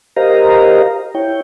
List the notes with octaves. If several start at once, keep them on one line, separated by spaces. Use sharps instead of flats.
G4 A#4 C5 D#5 F5 A#5
E4 C#5 G5